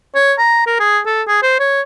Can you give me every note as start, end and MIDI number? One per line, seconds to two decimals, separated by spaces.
0.15 0.34 73
0.38 0.65 82
0.67 0.79 70
0.80 1.00 68
1.06 1.23 69
1.28 1.39 68
1.43 1.57 72
1.60 1.81 73